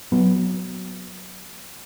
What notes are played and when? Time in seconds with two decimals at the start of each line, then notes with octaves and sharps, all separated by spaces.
0.12 F#3 B3